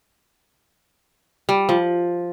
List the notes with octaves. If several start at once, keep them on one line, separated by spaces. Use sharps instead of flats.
G3
F3